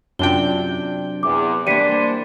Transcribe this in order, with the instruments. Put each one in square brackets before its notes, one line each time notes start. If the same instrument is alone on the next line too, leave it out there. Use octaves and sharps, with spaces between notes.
[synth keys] F#2 D4 G5 [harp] C3 C4 [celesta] F4 G7
[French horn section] E2 [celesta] D6
[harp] E3 A#3 [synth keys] G3 [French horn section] D4 C5 [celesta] B6 C#7 D#7